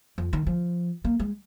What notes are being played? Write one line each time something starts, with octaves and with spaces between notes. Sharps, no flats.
F2
D#3
F3
A#3
G#3